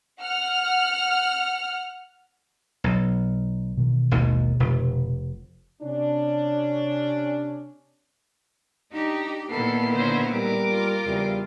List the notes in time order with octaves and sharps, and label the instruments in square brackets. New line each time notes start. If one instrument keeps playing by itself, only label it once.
[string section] F#5 F6
[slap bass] B1
[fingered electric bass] B2 D#3 E3
[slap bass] G#1 D#2
F1
[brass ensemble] C3 C#4 D4
[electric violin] D4 D#4 [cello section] G4
[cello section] A#2 D#3 E4 [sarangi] B3 [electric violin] A4 C7
[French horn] D3 [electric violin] C5 C#5
[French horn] G3 [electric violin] A#4 D6
[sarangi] F4
[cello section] E2 C#3 C4 [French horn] G3